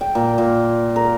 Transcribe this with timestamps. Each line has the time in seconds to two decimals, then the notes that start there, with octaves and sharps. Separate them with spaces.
0.01 G5
0.15 A#2
0.38 A#2
0.96 A#4